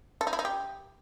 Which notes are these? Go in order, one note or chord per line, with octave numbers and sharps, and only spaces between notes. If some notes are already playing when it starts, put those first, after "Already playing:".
A4
D#4
E4
D#4
G4